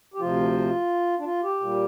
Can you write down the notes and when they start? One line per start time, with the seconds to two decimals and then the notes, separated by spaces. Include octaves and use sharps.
0.14 G4
0.20 D2 C3 F3 F4
1.19 D4
1.25 F4
1.43 G4
1.60 A#2 G3